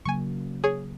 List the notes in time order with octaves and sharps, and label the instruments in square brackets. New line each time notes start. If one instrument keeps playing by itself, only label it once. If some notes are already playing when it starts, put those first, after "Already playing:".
[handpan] C#3 F#3 A#3 [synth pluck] G#5 C#6
[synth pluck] G#4 C#5